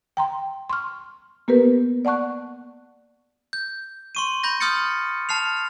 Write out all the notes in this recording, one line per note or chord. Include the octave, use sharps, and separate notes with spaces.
G5 A#5 C6
C6 C#6 F6
A#3 B3 G4 A#4 B4
D5 F#5 A5 C#6 F#6
G6
C6 C#6 D#7
B5 G6 A#6
C6 D#6 F6 G6 A6 C#7
A5 F6 C7 F7